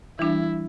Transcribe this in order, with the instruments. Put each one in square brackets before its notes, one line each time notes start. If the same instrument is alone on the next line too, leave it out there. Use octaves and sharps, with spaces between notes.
[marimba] E3 G3 D4 [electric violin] E4